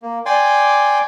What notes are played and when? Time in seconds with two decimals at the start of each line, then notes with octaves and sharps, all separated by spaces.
0.02 A#3
0.26 D5 G5 G#5 C6 D6